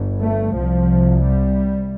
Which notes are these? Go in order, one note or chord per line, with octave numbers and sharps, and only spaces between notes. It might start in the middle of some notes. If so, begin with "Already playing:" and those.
Already playing: G1 G2
A3
C2 C3 F3
G3